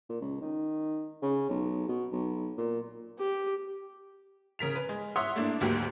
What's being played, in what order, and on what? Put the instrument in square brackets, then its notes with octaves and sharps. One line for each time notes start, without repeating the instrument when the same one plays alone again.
[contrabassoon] A#2
C#2
D#3
C#3
B1
B2
B1
A#2
[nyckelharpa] G4
[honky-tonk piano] C#3 A#4 B6 F7
B4
G#3
C#5 E5 F#5 C6 D#6
A3 A#3 D4 E4
G1 D2 G#2 F#3 A#3 G4